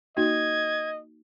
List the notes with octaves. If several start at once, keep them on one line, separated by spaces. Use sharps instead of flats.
A#3 D#4 F#4 D#5 G#6